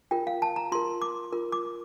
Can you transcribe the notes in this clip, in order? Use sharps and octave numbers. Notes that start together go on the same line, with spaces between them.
F4 A#4 G5
F5
A5
A#5
F4 A#4 C6
D6
F4 A#4
D6